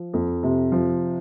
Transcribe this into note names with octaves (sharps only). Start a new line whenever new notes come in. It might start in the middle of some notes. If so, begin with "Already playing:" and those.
Already playing: F3
F2
C3
F3